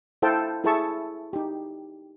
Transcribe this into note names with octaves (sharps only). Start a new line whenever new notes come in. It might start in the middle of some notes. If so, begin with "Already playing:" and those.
E4 A4 C5 F5 G5 A5
E4 G#4 A4 E5 A5 C#6
D#4 G4